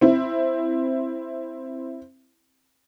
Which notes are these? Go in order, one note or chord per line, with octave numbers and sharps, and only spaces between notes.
C4 E4